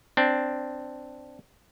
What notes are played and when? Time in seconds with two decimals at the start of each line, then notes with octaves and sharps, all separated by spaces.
0.17 C4 D4